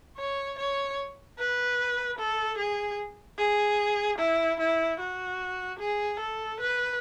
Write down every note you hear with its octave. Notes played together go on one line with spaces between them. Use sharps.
C#5
C#5
B4
A4
G#4
G#4
E4
E4
F#4
G#4
A4
B4